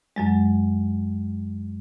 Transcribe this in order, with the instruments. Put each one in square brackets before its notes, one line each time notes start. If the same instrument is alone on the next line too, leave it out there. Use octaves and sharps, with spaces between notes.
[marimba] F#2 F#3 G#3